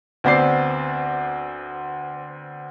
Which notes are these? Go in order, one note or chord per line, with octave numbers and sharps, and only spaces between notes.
D2 B3 C4 C5 D5 C7